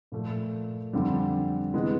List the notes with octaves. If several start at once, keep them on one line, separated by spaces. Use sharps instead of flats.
A#2 F3 A3
F2 D3 G3 C4
C3 E3 G#3 B3